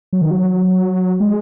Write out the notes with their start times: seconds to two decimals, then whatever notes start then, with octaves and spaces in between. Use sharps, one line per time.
0.13 F#3
0.21 D#3
0.31 F#3
1.20 G#3